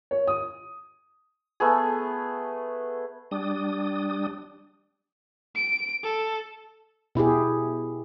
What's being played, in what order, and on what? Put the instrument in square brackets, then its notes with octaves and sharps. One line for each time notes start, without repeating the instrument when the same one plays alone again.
[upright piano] C#5
D#6
[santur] A3 B3 G#4
[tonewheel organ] G3 D4 D#6
[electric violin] D7
A4
[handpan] B2 E4 G4 G#4